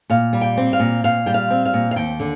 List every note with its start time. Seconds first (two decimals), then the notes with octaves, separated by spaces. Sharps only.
0.10 A#2 F5
0.33 G3
0.41 G5
0.57 C4
0.73 F5
0.80 A#2
1.04 A#2 F5
1.26 G3 G5
1.34 F5
1.50 C4
1.65 F5
1.74 A#2
1.91 F5
1.96 D#2 G5
2.20 D3